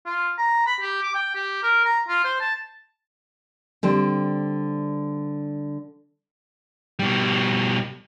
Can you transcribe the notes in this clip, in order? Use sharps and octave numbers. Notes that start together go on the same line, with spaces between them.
F4
A#5
B5
G4
D6
G5
G4
A#4
A#5
F4
C5
A5
D3 G3 C4
B2 G3